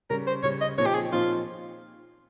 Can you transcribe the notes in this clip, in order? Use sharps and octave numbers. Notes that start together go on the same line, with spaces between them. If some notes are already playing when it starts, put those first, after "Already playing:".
C#3 G3 C#4 A#4
C5
C#3 G3 C#4 C#5
D#5
A#2 F3 C4 D#4 C#5
G4
G#4
A#2 F3 C4 D#4 F4